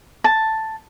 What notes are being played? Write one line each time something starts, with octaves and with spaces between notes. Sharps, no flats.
A5